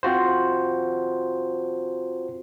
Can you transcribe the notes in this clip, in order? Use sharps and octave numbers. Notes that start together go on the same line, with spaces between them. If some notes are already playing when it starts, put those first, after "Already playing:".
C4 F4 F#4 C5